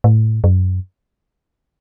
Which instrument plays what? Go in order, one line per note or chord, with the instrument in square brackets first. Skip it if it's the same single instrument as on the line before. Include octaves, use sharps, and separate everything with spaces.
[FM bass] A2
F#2